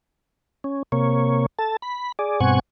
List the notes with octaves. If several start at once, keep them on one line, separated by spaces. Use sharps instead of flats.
C#4
C3 A#3 C#5
A4 A5
B5
G#4 D5
G2 B2 C4 F#5 G#5 C#6